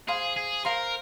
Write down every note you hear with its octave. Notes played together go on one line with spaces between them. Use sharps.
G#4 C5 F5 C6
G#4
A#4 C5 F5 C6